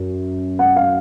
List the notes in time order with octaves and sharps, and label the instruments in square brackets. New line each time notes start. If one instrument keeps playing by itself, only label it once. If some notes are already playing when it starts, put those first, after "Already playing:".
Already playing: [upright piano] F#2
F#5
F5